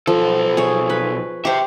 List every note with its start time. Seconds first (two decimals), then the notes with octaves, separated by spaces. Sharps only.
0.07 B1 F3 A4
0.57 G#4 C#5
0.90 B4
1.45 G4 C5 E5 G5